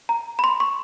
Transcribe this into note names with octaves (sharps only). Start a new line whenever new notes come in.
A#5
B5
C6
C#6